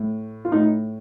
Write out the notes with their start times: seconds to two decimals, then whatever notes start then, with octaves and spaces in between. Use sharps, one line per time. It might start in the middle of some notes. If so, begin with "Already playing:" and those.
Already playing: A2
0.45 F4
0.52 A2 D#4